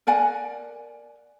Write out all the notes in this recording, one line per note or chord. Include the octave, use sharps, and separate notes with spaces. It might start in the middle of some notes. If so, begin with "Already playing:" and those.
A#4 D5 F#5 G#5